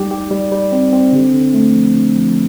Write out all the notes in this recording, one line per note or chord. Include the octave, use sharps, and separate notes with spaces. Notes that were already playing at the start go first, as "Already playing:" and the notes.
Already playing: G3 D#4 G4
G4
G3
G3
C4
C4
D3
D3
A3
F3
D3
F3